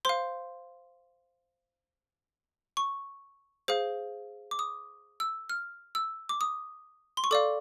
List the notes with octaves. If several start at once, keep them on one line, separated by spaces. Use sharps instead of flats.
C5 F5 C6
C#6
G#4 C5 F5
D6
D#6
E6
F6
E6
D6
D#6
C6
C#6
A4 D5 F5 D6